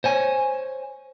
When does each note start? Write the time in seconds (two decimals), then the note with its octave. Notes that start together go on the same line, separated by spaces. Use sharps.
0.04 C5 C#5 G#5